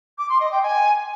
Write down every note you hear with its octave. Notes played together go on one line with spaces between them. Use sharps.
D6
C6
D#5
G5
G#5